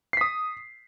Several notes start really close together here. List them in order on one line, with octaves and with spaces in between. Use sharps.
C7 B6 D#6